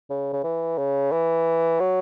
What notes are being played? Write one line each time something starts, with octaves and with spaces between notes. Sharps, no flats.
C#3
C#3
E3
C#3
E3
F#3